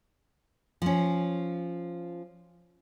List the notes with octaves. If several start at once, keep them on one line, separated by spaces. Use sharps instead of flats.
F3 C#4